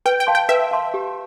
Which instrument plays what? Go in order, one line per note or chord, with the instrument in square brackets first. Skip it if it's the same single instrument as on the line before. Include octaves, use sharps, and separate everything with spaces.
[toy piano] B4 [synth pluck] G5
[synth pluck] G5
[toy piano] F5 A5 C6
[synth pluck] G5
[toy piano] B4 [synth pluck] E5
[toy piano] F5 A5 C6
G4